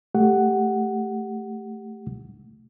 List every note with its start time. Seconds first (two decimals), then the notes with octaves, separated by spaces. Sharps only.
0.15 A3 G4 F#5